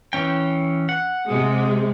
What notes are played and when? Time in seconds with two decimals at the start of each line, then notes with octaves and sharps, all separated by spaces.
0.13 E3 C#4 G5
0.89 F#5
1.28 C3 G#3